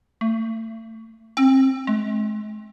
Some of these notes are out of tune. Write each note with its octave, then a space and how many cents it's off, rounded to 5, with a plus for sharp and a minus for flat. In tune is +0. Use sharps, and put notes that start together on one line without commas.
A3 +35
C4 +30
G#3 +45